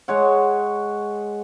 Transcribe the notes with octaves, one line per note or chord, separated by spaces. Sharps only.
G#3 C#5 F#5